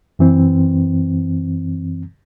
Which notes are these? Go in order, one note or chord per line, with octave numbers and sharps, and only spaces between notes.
F#2 E3 C4